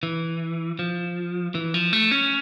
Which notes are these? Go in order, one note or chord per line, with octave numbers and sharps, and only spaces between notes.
E3
F3
E3
F3
A3
C#4